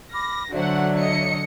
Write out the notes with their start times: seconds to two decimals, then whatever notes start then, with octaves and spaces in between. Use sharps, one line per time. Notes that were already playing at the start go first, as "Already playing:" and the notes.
0.13 B5 D6 F6 A#6
0.53 D3 F#3 F#4 C5 D5 E5 F#5
0.97 C#5 D#5 C#7